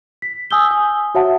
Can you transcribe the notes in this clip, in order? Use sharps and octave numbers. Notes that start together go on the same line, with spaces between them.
B6
G#5 D#6 E6 G6 G7
G#5 D#6
F#4 C#5 E5 F#5 A5